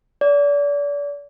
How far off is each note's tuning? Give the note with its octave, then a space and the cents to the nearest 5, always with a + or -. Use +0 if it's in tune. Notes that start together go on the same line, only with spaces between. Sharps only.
D5 -35